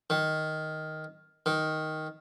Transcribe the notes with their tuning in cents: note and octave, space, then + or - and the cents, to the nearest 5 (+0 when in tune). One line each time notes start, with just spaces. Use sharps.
D#3 +5
D#3 +5